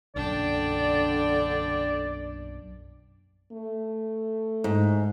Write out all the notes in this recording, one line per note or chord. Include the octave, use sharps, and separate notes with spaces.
B1 F#2 A#2 D3 D4 D5 G5
A3
G#2